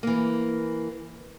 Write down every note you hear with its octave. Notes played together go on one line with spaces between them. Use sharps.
E3 A#3